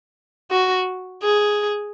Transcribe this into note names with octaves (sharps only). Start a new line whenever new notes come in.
F#4
G#4